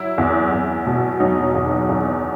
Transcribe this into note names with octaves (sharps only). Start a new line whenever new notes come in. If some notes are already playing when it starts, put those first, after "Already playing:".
Already playing: F#3 E4
E2
E2
B2
F#3 D#4
E2
E2